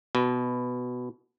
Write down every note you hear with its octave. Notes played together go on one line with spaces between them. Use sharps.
B2